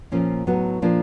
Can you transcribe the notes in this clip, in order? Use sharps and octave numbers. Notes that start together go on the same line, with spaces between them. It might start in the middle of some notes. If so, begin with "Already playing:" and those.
A#2 F3 A#3 C#4
A2 F#3 B3 D#4 F#4
A#2 F3 A#3 D4